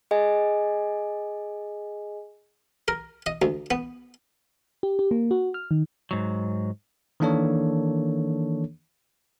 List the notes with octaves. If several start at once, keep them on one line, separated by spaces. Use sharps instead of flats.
G#4 D#5 G#5
A#4
D#5
D2
B3
G4
G4
A#3
F#4
F6
D#3
G#2 F#3
D#3 E3 A#3 D4 A4 C#5